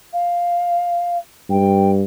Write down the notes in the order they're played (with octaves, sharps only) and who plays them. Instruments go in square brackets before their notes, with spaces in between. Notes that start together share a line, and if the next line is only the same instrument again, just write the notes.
[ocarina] F5
[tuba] G2 [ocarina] G5